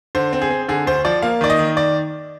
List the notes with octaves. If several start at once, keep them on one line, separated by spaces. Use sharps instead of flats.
D3 C5
C4
G#4
C4
D3 G#4
D2 C5
F3 D5
A#3 F5
D#3 D5
D#5
D#3
D5